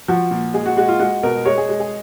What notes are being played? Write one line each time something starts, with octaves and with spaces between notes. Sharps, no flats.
F3 F#4
A#2
G#3 G#4
F#4
G#3 F#4
F4
G#3 F#4
B2 A#4
G#3 C#5
G#4
G#3
G#4